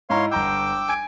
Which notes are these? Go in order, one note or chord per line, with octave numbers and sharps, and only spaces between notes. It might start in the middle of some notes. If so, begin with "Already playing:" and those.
G#2 E4 C#5 F5 A#5 C6
G1 G5 A#5 D6 E6 G6
G#5 G#6 D7